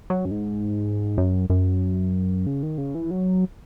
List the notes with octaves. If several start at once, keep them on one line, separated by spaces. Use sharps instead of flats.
F#3
F#2
G#2
F#2
F#2
C#3
D#3
C#3
E3
F#3